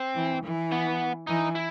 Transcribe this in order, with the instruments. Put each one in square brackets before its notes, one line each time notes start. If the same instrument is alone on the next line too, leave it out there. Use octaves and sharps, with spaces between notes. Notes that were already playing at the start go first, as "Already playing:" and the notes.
Already playing: [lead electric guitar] C4
[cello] E3
E3
[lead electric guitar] B3
[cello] E3 [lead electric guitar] D#4
[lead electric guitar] E4